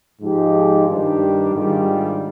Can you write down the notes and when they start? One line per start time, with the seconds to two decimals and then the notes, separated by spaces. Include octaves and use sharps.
0.21 G#2 F3 G#3 D#4 G4
0.86 G2 D#3 G3 D4 G4
1.52 G#2 D#3 G3 D4 F4